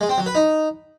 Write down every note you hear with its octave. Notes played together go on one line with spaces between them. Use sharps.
G#3
C4
F#3
B4
D#4